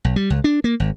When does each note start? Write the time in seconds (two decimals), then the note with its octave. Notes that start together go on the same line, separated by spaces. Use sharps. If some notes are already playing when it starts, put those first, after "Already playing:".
0.05 B1
0.16 G3
0.30 C#2
0.44 D4
0.64 A#3
0.80 G#1